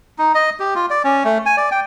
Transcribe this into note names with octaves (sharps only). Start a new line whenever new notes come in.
D#4
D#5
G4
F4
D5
C#4
A3
G#5
D5
G5